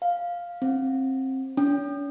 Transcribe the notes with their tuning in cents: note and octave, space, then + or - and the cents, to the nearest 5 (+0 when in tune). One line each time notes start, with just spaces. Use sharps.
F5 +0
C4 +20
C#4 +45